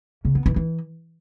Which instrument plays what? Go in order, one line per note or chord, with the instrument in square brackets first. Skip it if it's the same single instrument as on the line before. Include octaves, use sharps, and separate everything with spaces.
[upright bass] C#3
B3
E3
E3